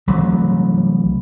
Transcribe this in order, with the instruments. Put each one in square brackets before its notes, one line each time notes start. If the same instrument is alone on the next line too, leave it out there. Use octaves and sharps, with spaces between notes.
[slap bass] C2 E3 F#3 A3